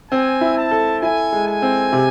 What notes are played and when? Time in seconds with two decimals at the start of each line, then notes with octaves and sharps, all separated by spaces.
0.11 C4 G#5
0.41 E4
0.56 A5
0.71 A4
1.02 E4 G#5
1.32 G#3
1.47 G#5
1.62 C4
1.93 C3